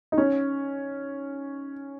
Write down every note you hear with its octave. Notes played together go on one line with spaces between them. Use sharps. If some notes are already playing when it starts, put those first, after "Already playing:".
D#4
C#4